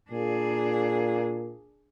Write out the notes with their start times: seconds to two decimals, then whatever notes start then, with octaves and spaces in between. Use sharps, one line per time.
0.11 A#2 D4 G#4